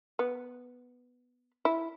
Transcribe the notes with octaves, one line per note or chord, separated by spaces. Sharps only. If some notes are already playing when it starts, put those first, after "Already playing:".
B3
E4